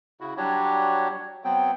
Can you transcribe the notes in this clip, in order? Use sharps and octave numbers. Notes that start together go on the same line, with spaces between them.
C#3 E4 F#4
F#3 G3 D4 F#4 G4 C#5
F#3 B3 C4 G5